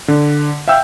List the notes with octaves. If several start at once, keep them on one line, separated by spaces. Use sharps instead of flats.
D3
E5 F5 G5 E6 G6